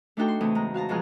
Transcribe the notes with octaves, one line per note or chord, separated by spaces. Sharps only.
A3 D4 D#4 F#4 A4 G5
C6
E2 C#3 A3 C4 D#6
G#2 A#5
F#4 F5 A5 A#5
E2 G#2 B2 F3 G#4 F6